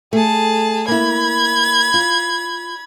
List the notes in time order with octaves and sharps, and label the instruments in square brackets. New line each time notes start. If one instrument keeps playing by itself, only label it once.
[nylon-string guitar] A3 [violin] G#4 A5
[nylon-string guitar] A#3 E4 [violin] B5 G#6
[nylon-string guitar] F4